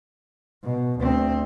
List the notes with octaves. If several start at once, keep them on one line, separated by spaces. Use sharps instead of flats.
B2
D2 C4